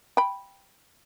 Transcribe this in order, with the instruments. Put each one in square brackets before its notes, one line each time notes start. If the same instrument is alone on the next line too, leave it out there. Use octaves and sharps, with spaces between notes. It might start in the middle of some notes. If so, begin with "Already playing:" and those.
[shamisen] G5 B5